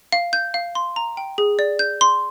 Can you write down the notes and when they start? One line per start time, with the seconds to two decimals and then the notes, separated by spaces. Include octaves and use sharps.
0.12 F5
0.33 G6
0.54 F5
0.75 C6
0.96 A#5
1.17 G5
1.38 G#4
1.59 D5
1.79 G6
2.01 C6